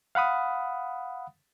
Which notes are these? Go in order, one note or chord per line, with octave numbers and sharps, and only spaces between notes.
F5 F#5 B5 D#6